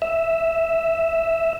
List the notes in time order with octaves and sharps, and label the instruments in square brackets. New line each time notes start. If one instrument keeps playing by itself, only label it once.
[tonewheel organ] E5